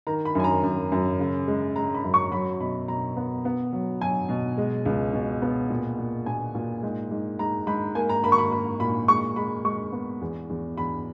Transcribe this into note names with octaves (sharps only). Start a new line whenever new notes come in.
D#3 A#5
B5
F#2 G#5
A#5
F#2
F#2
C#3
G#3
G#3 A#5
B5
F#2
C#6
F#3 B5
B2 B5
B2 A#5
B3
B3
F#3
F#3 G#5
B2
G#3
C#2
B2
B3
A#2
A#2
A#2 G#5
A#2
G#2
G#2
G#2 A#5
G#2 B5
A#3 G#5
A#5
A#3 B5
C#6
B5
A#3 B5
A#2 B5
G#3 C#6
G#3 B5
G#3 C#6
B3
E2
E2
E2 B5